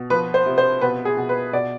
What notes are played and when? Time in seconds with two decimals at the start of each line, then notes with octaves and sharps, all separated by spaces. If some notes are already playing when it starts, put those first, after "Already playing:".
Already playing: B2
0.10 F3 B4
0.34 C5
0.46 C3
0.58 C5
0.81 B2 B4
1.05 G#4
1.17 B2
1.29 B4
1.53 B2 D5